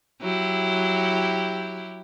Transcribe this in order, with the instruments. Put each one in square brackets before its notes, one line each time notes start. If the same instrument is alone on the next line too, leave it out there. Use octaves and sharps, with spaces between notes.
[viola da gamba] F#3 E4 G4